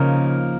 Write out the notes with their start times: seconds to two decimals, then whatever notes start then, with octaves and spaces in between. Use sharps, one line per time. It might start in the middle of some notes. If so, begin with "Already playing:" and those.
Already playing: C#3 F3 A#3 D#4 A#4